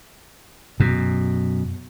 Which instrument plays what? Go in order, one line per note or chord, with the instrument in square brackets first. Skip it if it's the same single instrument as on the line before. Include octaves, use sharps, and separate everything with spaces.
[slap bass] F#2 B2